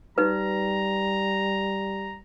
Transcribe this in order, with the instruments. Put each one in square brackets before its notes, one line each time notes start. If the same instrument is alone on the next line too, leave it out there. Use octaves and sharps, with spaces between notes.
[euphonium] G3 [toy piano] D#4 B4 [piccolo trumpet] A#5